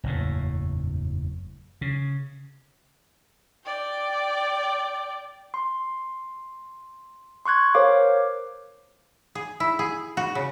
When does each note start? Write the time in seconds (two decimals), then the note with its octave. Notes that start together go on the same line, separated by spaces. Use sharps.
0.04 F#1 E2 A2
1.81 C#3
3.66 D5 G5
5.54 C6
7.46 C6 C#6 F#6 G#6
7.74 A#4 C5 C#5 F5 D6
9.35 G#4
9.60 E4
9.79 G#4
10.17 F#4
10.35 C#3